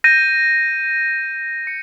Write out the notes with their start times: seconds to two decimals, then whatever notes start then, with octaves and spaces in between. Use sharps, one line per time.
0.04 G6 A#6 D#7
1.67 C#7